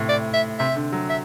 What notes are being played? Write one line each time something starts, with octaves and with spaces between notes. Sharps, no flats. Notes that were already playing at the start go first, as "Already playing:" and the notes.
Already playing: A2 C3
D5
E5
C3 E5
D3
F#3
E5